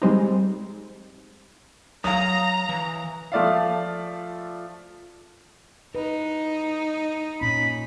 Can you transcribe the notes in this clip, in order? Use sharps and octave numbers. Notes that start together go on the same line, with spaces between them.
G3 G#3 C4 D#4
F#3 F5 A#5 D#6
E3
F3 A3 F4 D5 E5 F5
D#4 B4
A#2 C#4 B5